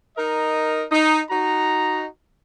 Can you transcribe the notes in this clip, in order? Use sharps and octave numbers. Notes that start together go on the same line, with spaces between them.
D#4 A#4 D#5
D#4
D#4 F#4 A#5